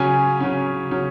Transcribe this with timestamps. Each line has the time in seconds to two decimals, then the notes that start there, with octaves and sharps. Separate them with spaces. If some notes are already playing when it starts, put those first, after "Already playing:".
Already playing: C#3 F#3 C#4 G#5
0.40 C#3 F#3 C#4
0.91 C#3 F#3 C#4